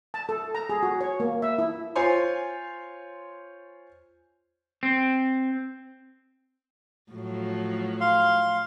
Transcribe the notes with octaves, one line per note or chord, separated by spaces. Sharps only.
A5
A4
A#5
G#4
F#4
C#5
A#3
E5
E4
F4 C5 C#5 G#5 C6
C4
A2 F3 F#3
F5 C6